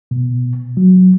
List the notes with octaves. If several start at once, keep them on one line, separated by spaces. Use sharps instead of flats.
B2
F#3